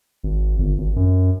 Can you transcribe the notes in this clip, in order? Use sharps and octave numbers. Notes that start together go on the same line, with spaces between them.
G#1
G1
G#1
F#2